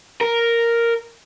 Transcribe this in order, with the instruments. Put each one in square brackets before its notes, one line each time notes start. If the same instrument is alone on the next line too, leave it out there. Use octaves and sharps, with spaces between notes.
[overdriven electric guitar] A#4